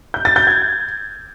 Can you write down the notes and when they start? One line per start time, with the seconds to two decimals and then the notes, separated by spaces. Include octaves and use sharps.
0.14 G6
0.25 A6
0.36 G6
0.47 G#6